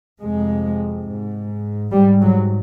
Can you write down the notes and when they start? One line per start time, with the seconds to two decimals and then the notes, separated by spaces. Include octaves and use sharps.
0.20 F2 C3 G#3
1.07 G#2
1.92 G#2 G3
2.21 F#3